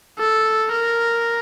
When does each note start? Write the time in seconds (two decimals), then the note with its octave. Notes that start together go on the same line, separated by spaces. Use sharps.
0.19 A4
0.72 A#4